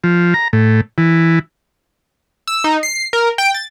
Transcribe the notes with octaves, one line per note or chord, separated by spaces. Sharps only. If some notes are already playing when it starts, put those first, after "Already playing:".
F3
A#5
A2
E3
E6
D#4
C7
A#4
G5
A6